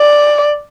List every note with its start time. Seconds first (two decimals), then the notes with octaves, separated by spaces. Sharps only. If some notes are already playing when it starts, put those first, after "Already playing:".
Already playing: D5